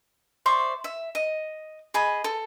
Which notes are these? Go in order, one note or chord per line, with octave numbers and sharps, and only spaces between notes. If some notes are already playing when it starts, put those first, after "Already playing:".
C5 D5 E5 C#6
E5
D#5
G#4 D#5 B5
A4